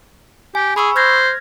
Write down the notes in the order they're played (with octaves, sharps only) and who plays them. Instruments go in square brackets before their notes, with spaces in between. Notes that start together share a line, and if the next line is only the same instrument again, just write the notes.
[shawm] G4 [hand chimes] G#5
[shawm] G#4 [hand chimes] B5 C#6 E6
[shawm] C5 [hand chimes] F6 G#6 A#6